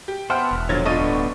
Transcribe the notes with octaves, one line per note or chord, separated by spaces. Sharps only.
G4
B3 C5 E5 F#5 G5 A5 C6 F6
E1
A#2 D3 F3 F#3 C#5 A6
G1 B3 D4 F4 A4 D#5 C#6 D#7
D1